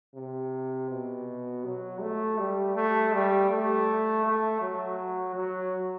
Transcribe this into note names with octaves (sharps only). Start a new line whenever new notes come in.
C3
B2
F#3
A3
G3
A3
G3
A3
A3
F#3
F#3